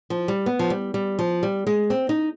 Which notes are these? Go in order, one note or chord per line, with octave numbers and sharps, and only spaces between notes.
F3
G3
B3
F3
G3
G3
F3
G3
G#3
C4
D#4